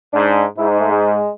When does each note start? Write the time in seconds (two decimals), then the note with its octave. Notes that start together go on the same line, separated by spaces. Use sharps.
0.13 G#2 D4
0.57 G#2 E4
0.69 D#4
0.80 A3
0.91 G#3